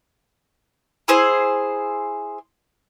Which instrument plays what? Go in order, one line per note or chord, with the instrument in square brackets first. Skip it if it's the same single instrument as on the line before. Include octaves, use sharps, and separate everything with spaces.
[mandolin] E4 G#4 C5